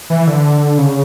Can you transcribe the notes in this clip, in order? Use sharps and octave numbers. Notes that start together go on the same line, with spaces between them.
E3
D3
C#3